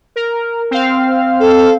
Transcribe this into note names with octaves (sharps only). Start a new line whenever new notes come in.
A#4
C4 F5
A4